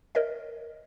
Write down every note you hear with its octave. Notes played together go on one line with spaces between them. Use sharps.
A#4 C#5 D#5 E5